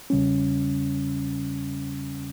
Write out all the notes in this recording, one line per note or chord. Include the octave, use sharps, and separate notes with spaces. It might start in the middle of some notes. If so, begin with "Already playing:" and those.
E2 C#3 G3 C#4